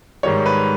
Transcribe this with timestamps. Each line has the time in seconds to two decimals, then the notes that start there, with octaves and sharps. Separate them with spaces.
0.23 G#2 D#3 G3 C#5
0.46 B4